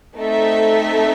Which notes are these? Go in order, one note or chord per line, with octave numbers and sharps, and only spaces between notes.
A3 C4 D#4 A4 E5